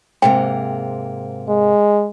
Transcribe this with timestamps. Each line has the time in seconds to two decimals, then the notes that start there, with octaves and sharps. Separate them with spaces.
0.22 G#2 C3 A#3 G5
1.49 G#3